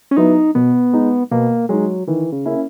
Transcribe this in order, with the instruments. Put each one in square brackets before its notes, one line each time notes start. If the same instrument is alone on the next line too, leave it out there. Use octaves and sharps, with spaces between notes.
[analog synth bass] C#4
[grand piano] F#3 B3 E4 [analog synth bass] D#4
[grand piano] B2 [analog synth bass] B3
[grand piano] G#3 D#4
[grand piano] B2 [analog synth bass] A#3
[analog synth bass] F#3 [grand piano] G#3 D#4
[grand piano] D#3 [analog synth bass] E3
[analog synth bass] C#3
[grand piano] A#3 C#4 E4